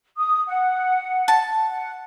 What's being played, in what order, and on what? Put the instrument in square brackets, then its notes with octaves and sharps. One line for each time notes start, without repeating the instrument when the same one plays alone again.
[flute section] D#6
F#5
[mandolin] A5
[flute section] F#5